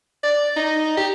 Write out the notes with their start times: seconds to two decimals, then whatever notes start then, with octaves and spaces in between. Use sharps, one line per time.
0.23 D5
0.57 D#4
0.97 G4